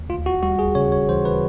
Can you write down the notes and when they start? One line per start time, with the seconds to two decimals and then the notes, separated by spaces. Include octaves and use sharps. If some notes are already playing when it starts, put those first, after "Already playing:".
Already playing: D#2
0.09 D2 F4
0.26 F#4
0.43 G3 F#4
0.59 G#4
0.75 C#3 C#5
0.92 C#5
1.09 E3 C5
1.25 B4